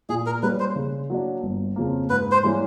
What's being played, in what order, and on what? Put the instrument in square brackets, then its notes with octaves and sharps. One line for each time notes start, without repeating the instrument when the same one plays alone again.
[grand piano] A#2 [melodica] G#4
[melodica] A#4
[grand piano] G3 A#3 C#4 [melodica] B4
[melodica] C5
[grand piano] C#3
F#3 A#3 D4
G1
F2 C#3 F3 A#3
[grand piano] G#2 [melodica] B4
[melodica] C5
[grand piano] E3 G3 A#3 C#4